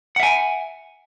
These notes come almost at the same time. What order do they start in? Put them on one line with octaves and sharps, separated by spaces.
F#5 E5 G#5